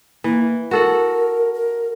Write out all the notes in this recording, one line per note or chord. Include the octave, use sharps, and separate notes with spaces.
E3 A#3
F#4 A4 A#4 F#5
A#4